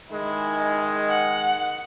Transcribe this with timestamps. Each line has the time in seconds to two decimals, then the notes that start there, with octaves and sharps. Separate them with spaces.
0.11 D#3 G#3 E4
1.09 F#5